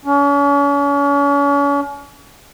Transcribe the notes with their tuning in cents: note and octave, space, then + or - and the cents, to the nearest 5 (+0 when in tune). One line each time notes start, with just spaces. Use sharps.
C#4 +40